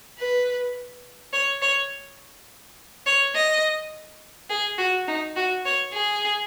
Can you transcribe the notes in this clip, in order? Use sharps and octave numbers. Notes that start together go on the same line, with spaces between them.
B4
C#5
C#5
C#5
D#5
G#4
F#4
D#4
F#4
C#5
G#4